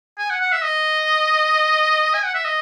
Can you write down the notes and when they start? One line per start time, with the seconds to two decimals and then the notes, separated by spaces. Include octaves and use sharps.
0.18 G#5
0.30 F#5
0.41 F#5
0.52 E5
0.64 D#5
2.14 G#5
2.25 F#5
2.35 E5
2.45 D#5